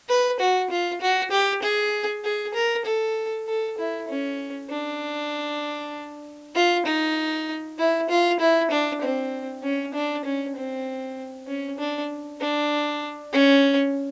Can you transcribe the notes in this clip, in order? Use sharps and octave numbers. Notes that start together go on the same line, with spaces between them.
B4
F#4
F4
F#4
G4
G#4
G#4
A#4
A4
A4
E4
C#4
D4
F4
D#4
E4
F4
E4
D4
C4
C#4
D4
C#4
C4
C#4
D4
D4
C#4